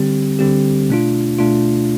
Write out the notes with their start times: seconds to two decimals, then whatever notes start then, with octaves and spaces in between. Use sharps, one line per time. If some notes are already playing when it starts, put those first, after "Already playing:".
Already playing: D3 G3 C4 G4
0.39 D3 G3 C4 G4
0.89 B2 A3 D4 F4
1.38 B2 A3 D4 F4